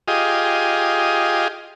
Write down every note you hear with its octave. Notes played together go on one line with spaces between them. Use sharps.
F4 G4 G#4 D#5